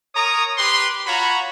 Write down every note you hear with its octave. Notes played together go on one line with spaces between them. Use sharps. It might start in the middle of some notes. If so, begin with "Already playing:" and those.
A#4 C#5 A#5 D#6
G4 B4 C6
F4 F#4 C#5 A#5 B5